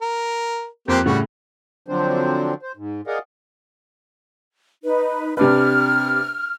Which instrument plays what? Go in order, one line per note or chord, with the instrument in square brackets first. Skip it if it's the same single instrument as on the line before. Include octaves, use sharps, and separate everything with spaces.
[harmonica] A#4
[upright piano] F2 F#6 [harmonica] A#3 C4 G4
[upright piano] A2 C#3 A3 [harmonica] G3 F#4
[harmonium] D3 F3 F#3 C4 D4 C5
C5
G#2
G#4 A#4 D5 D#5 F5 F#5
[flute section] D#4 B4
[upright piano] C3 D4 B4 [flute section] F6